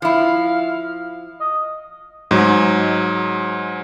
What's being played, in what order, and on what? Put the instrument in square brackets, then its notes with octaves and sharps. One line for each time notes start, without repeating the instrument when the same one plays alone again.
[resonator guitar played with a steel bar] F3 E4 [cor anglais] F5
[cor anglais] D#5
[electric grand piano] G#2 F#3 G#3